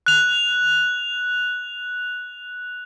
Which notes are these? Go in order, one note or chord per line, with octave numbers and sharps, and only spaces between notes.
F#6 F7